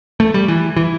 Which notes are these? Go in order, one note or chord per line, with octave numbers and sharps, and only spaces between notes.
A3
G3
E3
E3